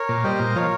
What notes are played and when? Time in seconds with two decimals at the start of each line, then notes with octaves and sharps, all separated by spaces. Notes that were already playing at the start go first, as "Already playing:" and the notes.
Already playing: A#4 C#5
0.09 A#2
0.24 G3 C5 D#5
0.40 A#2
0.55 F3 A#4 C#5